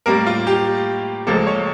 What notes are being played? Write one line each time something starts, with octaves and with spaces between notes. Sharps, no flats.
A2 G3 A#3 A#4
F4
G4
C#2 C#3 F3 A#3 A4
C#5